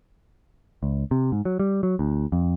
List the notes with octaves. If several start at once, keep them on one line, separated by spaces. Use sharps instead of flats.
C#2
C3
G#2
F#3
G3
F#3
D2
F2